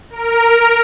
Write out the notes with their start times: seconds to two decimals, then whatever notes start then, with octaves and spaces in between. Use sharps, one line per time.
0.10 A#4